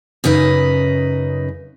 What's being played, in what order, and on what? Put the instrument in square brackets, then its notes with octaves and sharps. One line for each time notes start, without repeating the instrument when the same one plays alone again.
[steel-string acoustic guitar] F#2 C#3 D#4 B4